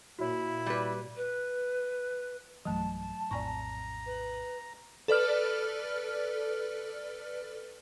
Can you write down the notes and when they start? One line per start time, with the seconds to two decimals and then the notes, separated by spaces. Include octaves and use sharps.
0.19 A#2 E4 F#4 C#5
0.66 G3 B4
1.16 B4
2.65 B1 G2 E3 F#3 A3 A5
3.31 A#1 F2 A2 D5 G#5 A#5 C#6
4.06 B4
5.08 A4 B4 D5 F6